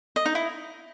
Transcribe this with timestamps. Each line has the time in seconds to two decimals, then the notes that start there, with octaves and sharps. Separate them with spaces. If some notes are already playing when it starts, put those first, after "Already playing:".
0.16 D#5
0.26 D#4
0.35 E4